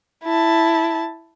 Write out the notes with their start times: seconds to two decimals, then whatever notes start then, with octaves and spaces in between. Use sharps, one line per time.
0.24 E4 A5